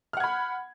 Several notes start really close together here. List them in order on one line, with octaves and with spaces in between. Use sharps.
F6 F#5 G#6 B5